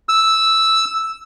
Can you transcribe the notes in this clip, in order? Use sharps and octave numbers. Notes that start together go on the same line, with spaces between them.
E6